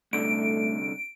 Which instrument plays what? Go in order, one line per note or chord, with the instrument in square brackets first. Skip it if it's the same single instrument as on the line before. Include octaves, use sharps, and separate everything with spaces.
[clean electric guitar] C2 D3 [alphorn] A3 [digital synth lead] D7